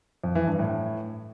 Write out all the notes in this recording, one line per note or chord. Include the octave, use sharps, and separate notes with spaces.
F2
E3
G2
A2